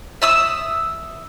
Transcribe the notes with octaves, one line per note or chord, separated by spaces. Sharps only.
E5 D#6 E6